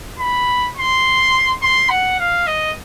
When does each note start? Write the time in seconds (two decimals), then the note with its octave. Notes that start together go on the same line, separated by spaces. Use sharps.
0.19 B5
0.76 C6
1.62 C6
1.90 F#5
2.19 F5
2.47 D#5